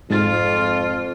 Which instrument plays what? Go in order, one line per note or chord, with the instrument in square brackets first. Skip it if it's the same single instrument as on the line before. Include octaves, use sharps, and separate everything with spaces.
[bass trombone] F2 [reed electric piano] G#2 A6 [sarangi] F4